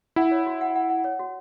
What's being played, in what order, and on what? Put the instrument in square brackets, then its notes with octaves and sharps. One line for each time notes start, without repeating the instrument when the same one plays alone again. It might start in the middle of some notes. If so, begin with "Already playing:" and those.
[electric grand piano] E4 [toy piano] F#5
[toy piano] C#5
F#4
F#5
F#5
F#5
C#5
F#4